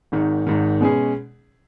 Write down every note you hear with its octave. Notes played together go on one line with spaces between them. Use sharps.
G#1 G#2 D#3
G#1 G#2 D#3
B2 G#3 C#4 G#4